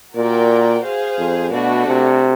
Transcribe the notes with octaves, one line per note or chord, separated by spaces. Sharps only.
A#2 F#4 A#4 D5 G5
G#4 C5 F5
F2
B2 A3 D4 F#4
C3